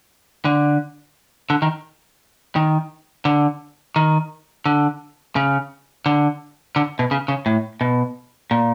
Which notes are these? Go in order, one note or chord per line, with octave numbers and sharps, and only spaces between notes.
D3
D3
D#3
D#3
D3
D#3
D3
C#3
D3
D3
B2
C#3
C#3
A2
B2
A#2